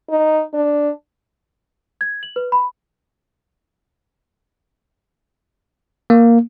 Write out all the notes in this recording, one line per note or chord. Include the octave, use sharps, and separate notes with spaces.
D#4
D4
G#6
F#7
B4
B5
A#3